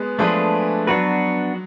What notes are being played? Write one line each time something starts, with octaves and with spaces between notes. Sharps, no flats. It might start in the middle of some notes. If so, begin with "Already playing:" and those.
Already playing: G#3 B3
F3 G#3 A3 D4 G#4 B4
F#3 B3 D4 F#4 B4